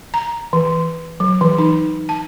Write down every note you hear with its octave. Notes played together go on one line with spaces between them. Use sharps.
A#5
E3
F#3
E3
D#4
A5